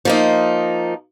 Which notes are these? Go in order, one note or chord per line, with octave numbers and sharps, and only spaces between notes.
F3 A#3 D#4